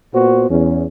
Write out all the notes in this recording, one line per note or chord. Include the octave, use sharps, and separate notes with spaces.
A#2 B3 F#4 C5
E2 C#4